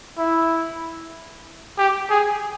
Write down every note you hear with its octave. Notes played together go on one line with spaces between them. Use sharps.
E4
G4
G#4